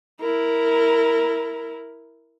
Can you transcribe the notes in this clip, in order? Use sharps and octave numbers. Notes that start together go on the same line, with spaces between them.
E4 A#4